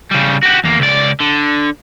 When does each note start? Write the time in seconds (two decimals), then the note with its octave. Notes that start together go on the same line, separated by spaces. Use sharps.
0.12 C#3 G3
0.43 F#4 G4
0.64 E2 A#3
0.79 C#2 D5
1.20 D3